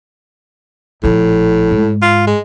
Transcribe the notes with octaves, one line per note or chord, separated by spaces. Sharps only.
A#1 A2 F3
G#2
F4
G#3